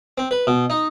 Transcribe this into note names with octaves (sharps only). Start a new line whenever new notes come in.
C4
B4
B2
D#4